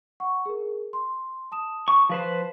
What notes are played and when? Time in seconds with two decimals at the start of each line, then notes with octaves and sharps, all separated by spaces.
0.20 F#5 C#6
0.46 G#4 A#4
0.93 C6
1.52 A5 D#6 E7
1.88 C#6
2.09 F3 B4 C5